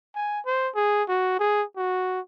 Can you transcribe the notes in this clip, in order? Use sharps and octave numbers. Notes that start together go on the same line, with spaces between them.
G#5
C5
G#4
F#4
G#4
F#4